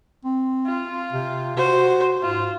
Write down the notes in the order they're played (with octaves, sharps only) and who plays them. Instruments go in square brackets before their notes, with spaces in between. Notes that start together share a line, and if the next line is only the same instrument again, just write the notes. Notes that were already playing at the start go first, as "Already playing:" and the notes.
[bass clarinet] C4
[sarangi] F4
[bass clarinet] C3
[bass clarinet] F#4 [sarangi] C5
[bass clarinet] G#2 [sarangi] F4